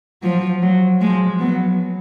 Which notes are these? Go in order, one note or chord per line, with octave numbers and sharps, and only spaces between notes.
F3 F#3
F#3
F3 G#3
F#3 B3